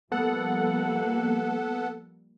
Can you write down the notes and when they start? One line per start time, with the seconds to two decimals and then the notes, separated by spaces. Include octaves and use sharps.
0.12 F3 G3 A#3 B3 A4 F#5